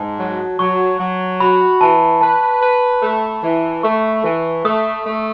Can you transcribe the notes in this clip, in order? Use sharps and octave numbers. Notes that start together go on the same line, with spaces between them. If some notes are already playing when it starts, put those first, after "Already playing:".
Already playing: G#2 A5
F#3
F#3 C#6
F#3
F#4 B5
E3 A5
B4 A5
B4
A3
E3
A3 C#6
E3
A3 D#6
A3